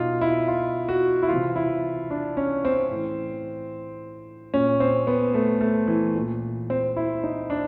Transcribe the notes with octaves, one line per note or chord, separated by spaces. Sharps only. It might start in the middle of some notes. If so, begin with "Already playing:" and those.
Already playing: B2 D#4 F4
E4
F4
F#4
E4
C3 E3 F4
E4
D4
C#4
C4
A2 E3
A#2 C#4
C4
B3
A3
A3
E3
A#2
C4
E4
D#4
D4